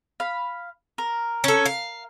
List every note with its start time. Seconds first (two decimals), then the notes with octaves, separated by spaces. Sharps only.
0.20 F5 B5
0.98 A#4
1.44 C#4 A4
1.66 F5